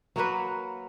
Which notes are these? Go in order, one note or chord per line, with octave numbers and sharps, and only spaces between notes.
F#3 A#3 F#4 B4